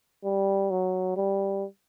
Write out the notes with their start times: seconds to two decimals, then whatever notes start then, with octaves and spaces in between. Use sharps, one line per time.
0.24 G3
0.71 F#3
1.17 G3